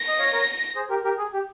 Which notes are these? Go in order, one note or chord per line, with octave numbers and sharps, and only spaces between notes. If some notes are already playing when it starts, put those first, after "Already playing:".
Already playing: A#6
D#5
C#5 F5
A#4 C#5
G#4 C5
G4 A#4
G4 A#4
G#4
G4